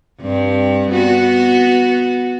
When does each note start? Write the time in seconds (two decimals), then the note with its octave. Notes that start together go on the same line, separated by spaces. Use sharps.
0.20 G2 C4
0.91 B3 F#4